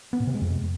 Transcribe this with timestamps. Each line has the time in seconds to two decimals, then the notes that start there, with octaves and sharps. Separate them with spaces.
0.13 B3
0.20 A#2
0.27 C3
0.34 G#3
0.41 F2